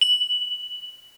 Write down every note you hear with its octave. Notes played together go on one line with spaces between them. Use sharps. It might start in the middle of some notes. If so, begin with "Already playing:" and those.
F#7